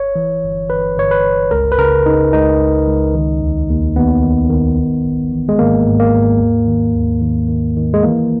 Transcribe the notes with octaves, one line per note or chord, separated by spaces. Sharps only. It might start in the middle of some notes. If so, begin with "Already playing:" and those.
Already playing: G1 C#5
E3
G1
G1 B4
G1 C#5
B4
G1
C#2 A#4
B4
C#3 A#4
C#3 D#4
C#2 D#4
C#2
C#2
D#3
D#2
D#2
D#2 B3
D#3
D#3
G#1
G#1
E3
G#3
G#1 A#3
G#2
A#3
G#2
D#2
D#3
D#2
D#3
D#3
D#3
G#3
E3 A#3